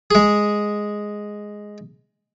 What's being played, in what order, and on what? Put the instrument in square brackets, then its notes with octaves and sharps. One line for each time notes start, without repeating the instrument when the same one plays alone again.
[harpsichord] G#3 G#4